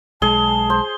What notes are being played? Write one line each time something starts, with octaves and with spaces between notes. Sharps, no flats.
B1 G#3 G#4 A5 G7
C5